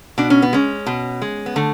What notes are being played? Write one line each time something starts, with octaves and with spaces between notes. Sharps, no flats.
B2 D4
C#4
B3
G#3 C#4
B2
G#3
B3
D3 A3